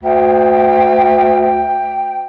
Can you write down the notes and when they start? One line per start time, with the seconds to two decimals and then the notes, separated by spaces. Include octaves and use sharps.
0.03 D2 G5
1.42 G5